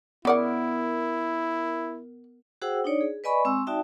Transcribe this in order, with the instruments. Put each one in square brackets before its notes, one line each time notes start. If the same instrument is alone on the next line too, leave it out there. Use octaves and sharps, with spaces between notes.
[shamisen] C#3 D5 F#5 [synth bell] B3 A#4 [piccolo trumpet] E4
[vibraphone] F#4 G#4 C5 F#5 G5 E6
D4 D#4 C#5 D5
G#4
B4 D5 D#5 G#5 B5 C#6
G#3 C4 G#5 C#6 E6
D#4 F#4 D5 E5 G5 A5